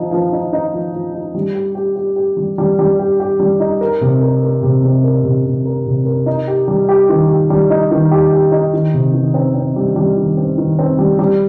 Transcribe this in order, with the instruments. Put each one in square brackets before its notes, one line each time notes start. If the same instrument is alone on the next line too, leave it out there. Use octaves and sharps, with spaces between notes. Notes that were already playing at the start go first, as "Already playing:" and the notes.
Already playing: [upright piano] F3 D#4
F3
D#4
D#4
F3
F3
D#4
G3
G4
G4
G4
G4
G3
G3
G3
G4
G4
G3
D#4
A#4
C3
A#4
A#4
C3
C3
A#4
C3
C3
A#4
C3
A#4
D#4
G4
G3
G4
D#3
G4
G3
D#4
D#3
G4
G4
D#4
D#3
C3
D#3
C4
C4
G3
G3
D#3
C4
D#3
C4
G3
G3